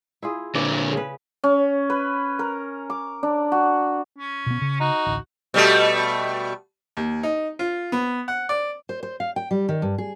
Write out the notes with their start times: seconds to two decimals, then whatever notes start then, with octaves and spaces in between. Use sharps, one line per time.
0.22 E4 F4 G#4
0.55 A#2 D3 B4 C#5 D5
0.93 C#3 B4
1.44 C#4
1.90 B4
2.39 A#4
2.90 D6
3.23 D4
3.52 F#4
4.18 C#4
4.46 B2 B3
4.61 C#3
4.80 D#4 F#4
5.06 A1 D2
5.54 B2 G3 A3
6.97 D#2
7.23 D#4
7.59 F4
7.92 B3
8.28 F#5
8.49 D5
8.89 C5
9.03 C5
9.20 F5
9.36 G5
9.51 G3
9.69 D#3
9.82 G2
9.98 G#4